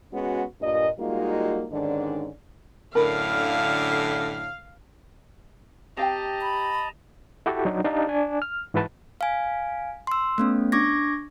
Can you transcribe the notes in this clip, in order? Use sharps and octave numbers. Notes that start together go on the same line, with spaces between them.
G#3 B3 C#4 F#4
G2 A#2 D#5
G3 G#3 A#3 D#4 F4 F#4
G#2 D3 D#3 C#4 D4 D5
F#2 A2 D3 A#4 F5 B5
C4 G4 D#5 F5 G5 A5 A#5
B5
E4 F#4 G4 A4
F#3 D4 D#4
D4 D#4 G4 F5 A5
D4 G#5
F6
G#2 E3 F#4 B4 A5
F5 G#5
C6 E6
A3 B3 C#4
D4 C#6 D6 G#6 A#6